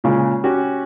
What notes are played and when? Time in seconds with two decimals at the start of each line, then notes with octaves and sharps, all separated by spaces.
0.04 A#2 C#3 G#3
0.44 C#4 F#4 G4